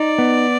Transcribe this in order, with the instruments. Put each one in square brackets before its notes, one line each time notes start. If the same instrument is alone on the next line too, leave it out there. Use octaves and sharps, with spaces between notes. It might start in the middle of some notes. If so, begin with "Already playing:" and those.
Already playing: [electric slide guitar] D#4 [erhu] D5
[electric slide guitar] B3